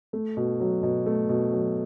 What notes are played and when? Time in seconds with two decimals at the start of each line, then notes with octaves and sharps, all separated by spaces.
0.13 A3
0.37 B2
0.60 F#3
0.83 B2
1.06 A3
1.29 B2
1.52 F#3